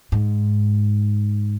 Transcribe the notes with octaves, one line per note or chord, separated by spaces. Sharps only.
G#2